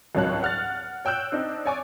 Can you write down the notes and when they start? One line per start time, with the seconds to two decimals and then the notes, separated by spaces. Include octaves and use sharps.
0.15 G#1 C#2 F#3 C#5 A5 F#6
0.43 F#5 F6 F#6 A6
1.05 C#5 G5 E6 F#6 G6
1.32 C4 D4 D#4
1.66 C#5 D5 G#5 C#6 D6